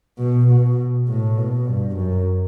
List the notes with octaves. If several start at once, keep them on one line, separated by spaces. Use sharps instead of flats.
B2
B2
A2
B2
G2
F#2